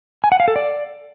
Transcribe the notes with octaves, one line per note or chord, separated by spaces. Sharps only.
G#5
F#5
F5
A4
D5